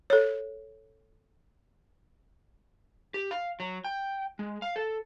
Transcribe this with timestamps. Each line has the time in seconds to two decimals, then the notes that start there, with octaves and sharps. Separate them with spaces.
0.10 A4 C#5
3.14 G4
3.31 F5
3.60 F#3
3.84 G5
4.39 G#3
4.62 F5
4.76 A4